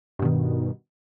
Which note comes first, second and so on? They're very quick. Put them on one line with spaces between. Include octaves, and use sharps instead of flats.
G2 B2 D#3